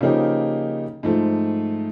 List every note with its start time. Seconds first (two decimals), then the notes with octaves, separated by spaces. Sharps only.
0.01 C#3 F3 A#3 D#4 G4
1.03 G#2 F3 A3